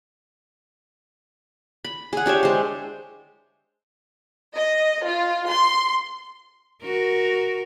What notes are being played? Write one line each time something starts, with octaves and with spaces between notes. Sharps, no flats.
B5
G#4 F#5
D4 G4 C#5 E5
G#3 C5
D#5
F4
C6
F#4 A#4